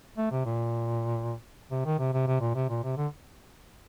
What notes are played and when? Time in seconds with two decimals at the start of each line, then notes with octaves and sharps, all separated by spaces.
0.18 A3
0.32 C3
0.45 A#2
1.71 C3
1.85 D#3
1.99 C3
2.13 C3
2.27 C3
2.41 A#2
2.55 C3
2.70 A#2
2.84 C3
2.97 D3